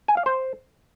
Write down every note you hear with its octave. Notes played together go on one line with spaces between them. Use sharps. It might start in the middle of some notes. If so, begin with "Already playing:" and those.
G#5
F5
C5